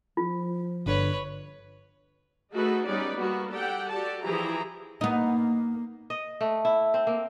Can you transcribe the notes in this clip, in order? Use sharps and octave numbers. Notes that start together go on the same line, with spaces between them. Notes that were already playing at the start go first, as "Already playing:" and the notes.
F3 F4
G1 D3 B4 C#5
A3 D#4 F#4 G#4 A4 B4
G3 B3 C#4 D#4 B4 D5
G3 A#3 B3 F#4
G4 A4 D5 F#5 G5
F#4 G4 A4 D5 A5
E3 F3 E4 G4 G#4 A#5
A#3 B3 D#4
D#5
A3
E4
C4
A#3